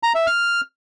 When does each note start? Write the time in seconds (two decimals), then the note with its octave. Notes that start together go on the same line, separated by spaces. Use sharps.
0.03 A#5
0.15 E5
0.27 F6